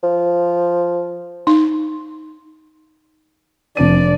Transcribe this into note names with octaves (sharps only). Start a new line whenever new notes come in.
F3
D#4
F1 D4 D5 D#7